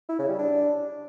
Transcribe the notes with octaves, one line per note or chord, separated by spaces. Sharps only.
E4
C#3
G3
D4